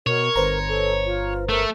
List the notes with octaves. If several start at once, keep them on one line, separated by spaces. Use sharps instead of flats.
B2 A#4 C#5
G1 B4 C5 A#5
A4
F4
A3 A#4